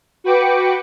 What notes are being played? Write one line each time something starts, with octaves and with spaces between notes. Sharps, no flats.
F#4 B4 G5 D6 C#7